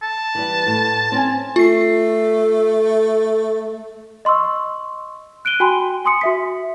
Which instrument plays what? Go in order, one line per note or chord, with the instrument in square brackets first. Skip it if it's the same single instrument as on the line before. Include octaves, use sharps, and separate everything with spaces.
[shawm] A5
[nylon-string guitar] E3 G3
A2
C4 C#4 G#5
[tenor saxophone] A3 [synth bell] F4 C7
[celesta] D#5 C6 C#6 E6
F#6 D7 D#7 G7
F#4 G5 G#5 B5 C6
G#5 C6 D#6 C#7
F#4 E5 B6